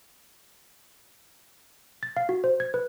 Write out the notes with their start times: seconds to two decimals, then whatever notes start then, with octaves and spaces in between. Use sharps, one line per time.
2.03 A6
2.17 F5
2.29 F#4
2.44 C5
2.60 G#6
2.74 B4